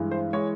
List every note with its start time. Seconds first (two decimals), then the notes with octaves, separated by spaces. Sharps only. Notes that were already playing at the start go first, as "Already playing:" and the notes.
Already playing: G2 E3 G#3
0.11 C5
0.33 E3 G#3 C#5